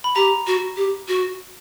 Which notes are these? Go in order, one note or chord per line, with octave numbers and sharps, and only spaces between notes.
B5
G4 A#5
F#4
G4
F#4